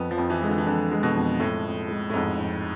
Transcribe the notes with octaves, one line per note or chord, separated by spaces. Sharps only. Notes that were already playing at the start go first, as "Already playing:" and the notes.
Already playing: F2 B3
F3
F2
E3
G#3
D3
E3
F2 D3
G#3
B2
F2
F2 A2
F2
G#3
A2
F2 G#2
F2